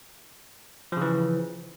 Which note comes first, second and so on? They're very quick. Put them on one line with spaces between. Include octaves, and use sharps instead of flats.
F3 C#3 E3